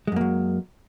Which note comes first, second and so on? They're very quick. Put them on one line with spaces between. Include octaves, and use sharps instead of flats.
G#3 F#2 A#3 F#3